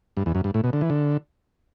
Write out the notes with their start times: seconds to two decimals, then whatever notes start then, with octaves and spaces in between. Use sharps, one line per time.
0.17 G2
0.26 E2
0.35 F#2
0.44 G2
0.54 A2
0.64 B2
0.73 D3
0.81 E3
0.90 D3